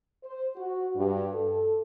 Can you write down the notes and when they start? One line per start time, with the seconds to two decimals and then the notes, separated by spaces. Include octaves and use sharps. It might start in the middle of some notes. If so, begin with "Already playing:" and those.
0.24 C5
0.56 F#4
0.95 G2
1.34 A4